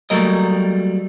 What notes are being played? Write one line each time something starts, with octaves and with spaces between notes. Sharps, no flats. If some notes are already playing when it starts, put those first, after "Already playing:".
F#3 G3 A3 A#3 A#4 D#5